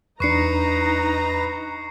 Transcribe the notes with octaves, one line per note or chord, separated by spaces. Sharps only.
E2 D4 D#4 B4 A#5 C#6 C7 C#7